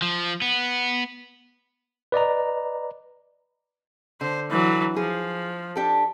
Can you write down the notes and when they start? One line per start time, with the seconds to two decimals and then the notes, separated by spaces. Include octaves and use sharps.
0.02 F3
0.42 B3
2.12 B4 D5 D#5 A#5
4.21 D3 C5
4.51 E3 F#3
4.96 F3 G#4
5.75 D4 G4 A4